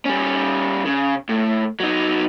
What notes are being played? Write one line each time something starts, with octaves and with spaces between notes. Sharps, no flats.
G3 C#4
C#3
A2
F#3 D#4